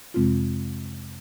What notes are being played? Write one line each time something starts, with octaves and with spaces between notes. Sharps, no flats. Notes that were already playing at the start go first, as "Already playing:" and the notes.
F2 C3 G#3 C4 F4